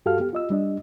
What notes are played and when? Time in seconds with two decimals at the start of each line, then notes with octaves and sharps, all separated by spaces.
0.06 G2 F#4 G4 A4 F5 F6
0.20 B3 G4
0.33 F4 D#5 E6
0.50 G3 D4 D#5